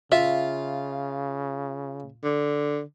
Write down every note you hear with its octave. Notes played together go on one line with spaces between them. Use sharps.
C#3 F4 E5
D3